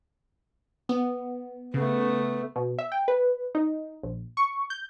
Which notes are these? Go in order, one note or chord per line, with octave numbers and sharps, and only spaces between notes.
B3
C#3 A3 B3
B2
E5
G5
B4
D#4
A#1
C#6
G6